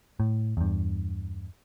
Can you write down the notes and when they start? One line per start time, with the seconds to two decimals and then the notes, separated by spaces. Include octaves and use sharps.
0.20 A2
0.57 E2 G2